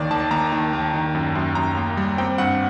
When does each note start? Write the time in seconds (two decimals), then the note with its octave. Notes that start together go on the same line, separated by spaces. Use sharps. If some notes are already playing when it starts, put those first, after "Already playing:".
Already playing: D#2 D#3 D5
0.11 D#2 A5
0.31 D#2 A#5
0.52 D#3
0.73 D#2
0.93 D#3
1.15 F#2
1.35 F#2
1.55 F#2 A#5
1.77 A#3
1.97 G3
2.18 C4 G5
2.38 G2 F#5